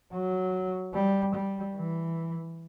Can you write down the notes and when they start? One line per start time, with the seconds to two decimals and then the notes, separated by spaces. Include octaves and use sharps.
0.12 F#3
0.94 G3
1.34 G3
1.75 E3